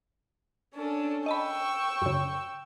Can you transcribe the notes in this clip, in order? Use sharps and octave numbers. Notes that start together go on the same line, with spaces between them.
C#4 D4 A4
D#5 G5 A5 B5 C#6 E6
F#2 C#3